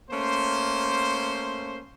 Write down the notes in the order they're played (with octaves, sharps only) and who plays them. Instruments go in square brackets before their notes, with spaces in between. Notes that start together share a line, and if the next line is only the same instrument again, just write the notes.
[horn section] A3 A#3 C#4 C5